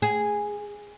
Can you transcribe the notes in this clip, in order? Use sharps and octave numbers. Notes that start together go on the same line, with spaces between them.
G#4